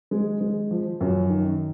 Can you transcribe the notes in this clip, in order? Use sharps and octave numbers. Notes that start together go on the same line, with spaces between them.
G#3
G#3
F3
F#2
D#3